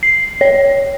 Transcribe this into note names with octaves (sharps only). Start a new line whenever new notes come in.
C7
C#5